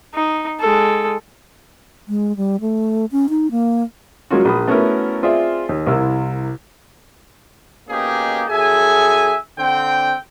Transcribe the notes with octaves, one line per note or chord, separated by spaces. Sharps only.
D#4
G#3 A4
G#3
G3
A3
C#4
D#4
A#3
F#3 G#3 A#3 C#4 F4 F#4
A#1 B5 D#6
A3 B3 C#4 E4 F#4 A#4
C4 F4 G#4 D5 E5
D#2
C2 C3 E4 A#4 E6
B2 A#3 C#4 D#4 G4 G#4
F#2 G#4 A4 E5 G#5
D3 C4 G5